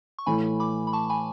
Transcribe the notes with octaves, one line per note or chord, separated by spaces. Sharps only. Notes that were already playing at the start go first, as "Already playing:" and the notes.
C#6
A2 E3 A3 G#5 B5
B5 D6
B5
A5 C#6
G#5 B5